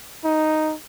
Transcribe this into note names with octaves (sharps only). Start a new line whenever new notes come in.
D#4